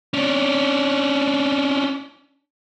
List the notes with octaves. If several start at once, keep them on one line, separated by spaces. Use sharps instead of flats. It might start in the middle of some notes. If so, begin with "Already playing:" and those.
C#4 D4